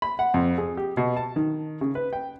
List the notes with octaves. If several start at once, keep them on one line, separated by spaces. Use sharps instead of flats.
B5
F#5
F2
G#4
G4
B2
A5
D#3
C#3
B4
G5